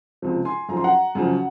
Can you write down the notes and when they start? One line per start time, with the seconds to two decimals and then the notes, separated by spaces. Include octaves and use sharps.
0.22 C#2 C3 F3
0.45 G#5 C6
0.69 F#2 F3 A#5
0.77 C6
0.84 F#5 A#5
1.15 F#2 C#3 F3